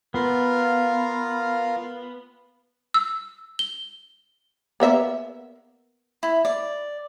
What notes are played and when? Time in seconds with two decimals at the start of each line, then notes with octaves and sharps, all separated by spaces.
0.14 B3 F4 A#4 F5
2.94 E6
3.59 G7
4.80 A#3 B3 E5
6.23 E4
6.45 D5